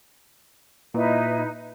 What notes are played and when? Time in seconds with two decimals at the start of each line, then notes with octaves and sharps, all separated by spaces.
0.94 A#2 D#4 E4 B4